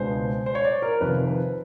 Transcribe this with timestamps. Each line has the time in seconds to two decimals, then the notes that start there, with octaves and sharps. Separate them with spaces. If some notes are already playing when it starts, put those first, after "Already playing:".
Already playing: C#2 B2 G#3 B3 D4 C5
0.46 C5
0.55 C#5
0.64 D5
0.82 A#4
1.01 F2 C3 D#3 B4
1.14 C5
1.27 B4